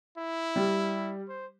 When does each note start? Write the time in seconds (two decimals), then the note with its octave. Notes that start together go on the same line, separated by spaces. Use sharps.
0.18 E4
0.56 G3
1.29 C5